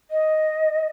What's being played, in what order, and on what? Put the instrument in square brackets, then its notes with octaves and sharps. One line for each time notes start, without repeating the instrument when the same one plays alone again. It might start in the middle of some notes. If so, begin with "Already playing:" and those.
[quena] D#5